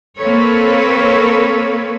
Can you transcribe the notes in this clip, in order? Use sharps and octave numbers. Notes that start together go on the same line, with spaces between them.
A#3 C4 A4 B4 C#5